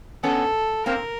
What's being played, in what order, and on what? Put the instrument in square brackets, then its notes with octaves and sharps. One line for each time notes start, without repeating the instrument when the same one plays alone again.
[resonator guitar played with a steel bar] B3 C#4 [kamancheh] A4
[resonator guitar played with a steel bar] A#3 C4 [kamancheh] A#4